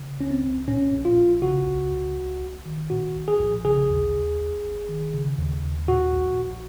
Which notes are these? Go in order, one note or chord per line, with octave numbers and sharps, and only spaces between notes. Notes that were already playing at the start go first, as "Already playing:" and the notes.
Already playing: C#3
C#2 C#4
C4
C#2
A#2 C#4
A#1
F4
A#1
C#3 F#4
C#2
C#2
A#1
A#1
D#3
A#2 F#4
A#1
G#4
A#1
C#3 G#4
D#2
D#2
G#1
G#1
D#3
C#3
D#2
D#2
A#2 F#4
A#1
A#1